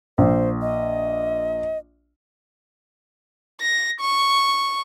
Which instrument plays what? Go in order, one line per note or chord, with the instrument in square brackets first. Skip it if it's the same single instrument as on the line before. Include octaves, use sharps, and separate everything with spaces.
[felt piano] A#1 [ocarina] C5
[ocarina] D#5
[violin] A#6
C#6